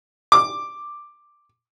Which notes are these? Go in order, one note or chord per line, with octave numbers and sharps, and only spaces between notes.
D6